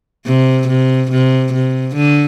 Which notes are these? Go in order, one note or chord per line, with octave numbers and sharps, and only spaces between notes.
C3
C3
C3
C3
D3